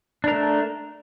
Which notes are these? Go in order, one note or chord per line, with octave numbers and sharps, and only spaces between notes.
A3 D4 A#4